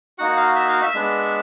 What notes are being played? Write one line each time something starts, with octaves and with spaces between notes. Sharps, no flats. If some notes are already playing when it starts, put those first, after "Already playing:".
A#3 D#4 F#4 F#5
F5
E5
F5
E5
G#3 B3 D4